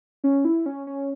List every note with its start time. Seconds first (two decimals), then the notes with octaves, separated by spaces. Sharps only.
0.24 C#4
0.45 E4
0.66 C#4
0.87 C#4